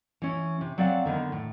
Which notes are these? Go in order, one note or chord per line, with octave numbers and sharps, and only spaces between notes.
E3 C#4
C3
F#3 C4 D5 F5 F#5
D3 D#3 B3
A2